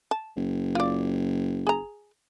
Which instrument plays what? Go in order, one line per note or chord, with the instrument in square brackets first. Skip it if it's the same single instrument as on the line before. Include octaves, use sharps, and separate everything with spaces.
[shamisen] A5
[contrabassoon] F#1
[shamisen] F4 D5
G#4 A#5